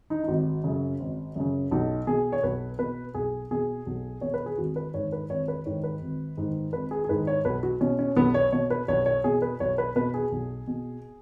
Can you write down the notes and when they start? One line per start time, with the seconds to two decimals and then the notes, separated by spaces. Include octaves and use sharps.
0.10 D#4
0.24 D#4
0.28 G#1 F#4
0.64 F#2 C#3
1.00 G#1
1.36 F#2 C#3
1.71 B1 D#4
2.07 B2 G#4
2.32 C#5
2.43 B1 B4
2.79 B2 B4
3.14 B1 G#4
3.51 B2 G#4
3.86 B1
4.21 B2 C#5
4.34 B4
4.46 G#4
4.58 G#1 F#4
4.76 B4
4.94 G#2 D#3 C#5
5.12 B4
5.30 G#1 C#5
5.48 B4
5.66 G#2 D#3 C#5
5.84 B4
6.02 G#1
6.37 G#2 D#3
6.73 G#1 B4
6.91 G#4
7.04 G#4
7.09 G#2 D#3 B4
7.27 C#5
7.45 B1 B4
7.63 F#4
7.81 B2 C#4
7.99 C#4
8.16 B1 B3
8.34 C#5
8.52 B2 C#5
8.70 B4
8.88 B1 C#5
9.06 C#5
9.24 B2 G#4
9.42 B4
9.60 B1 C#5
9.78 B4
9.96 B2 B4
10.14 G#4
10.32 B1
10.67 B2